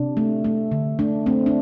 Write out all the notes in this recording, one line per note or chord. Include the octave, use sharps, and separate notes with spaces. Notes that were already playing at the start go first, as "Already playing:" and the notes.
Already playing: C3 D4
A3
A3
D3
A3 D4
A3 C4
D4